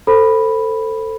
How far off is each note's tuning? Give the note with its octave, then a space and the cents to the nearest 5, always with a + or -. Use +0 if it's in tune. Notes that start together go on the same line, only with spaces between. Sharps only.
A4 +20 C5 +0 B5 +0